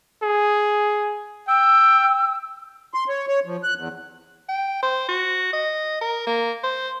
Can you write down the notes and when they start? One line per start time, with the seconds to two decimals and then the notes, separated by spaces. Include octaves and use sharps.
0.22 G#4
1.48 G5 E6
2.94 C6
3.09 C#5
3.28 C#5
3.46 F3
3.63 F#6
3.76 E2
4.48 G5
4.83 C5
5.09 F#4
5.53 D#5
6.01 A#4
6.27 A#3
6.63 C5